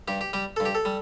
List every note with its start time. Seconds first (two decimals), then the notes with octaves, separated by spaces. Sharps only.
0.08 G2 G4
0.21 G4
0.33 G3 G4
0.56 G2 A4
0.65 G4
0.75 A4
0.85 G3